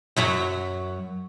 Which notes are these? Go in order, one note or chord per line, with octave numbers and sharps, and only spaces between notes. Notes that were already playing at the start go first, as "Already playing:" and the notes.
F#2 F#3 E5